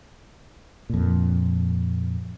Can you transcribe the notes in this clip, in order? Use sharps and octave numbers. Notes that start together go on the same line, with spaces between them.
F2 A#2